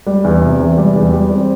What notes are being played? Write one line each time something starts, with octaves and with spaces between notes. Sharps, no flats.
G3
E2
C3
E2
G3
E2
G3
C4